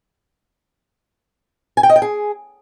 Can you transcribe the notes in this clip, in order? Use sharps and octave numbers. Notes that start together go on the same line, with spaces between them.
G#5
G5
D#5
G5
G#4